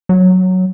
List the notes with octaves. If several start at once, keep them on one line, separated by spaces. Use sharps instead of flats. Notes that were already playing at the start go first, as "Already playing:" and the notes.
F#3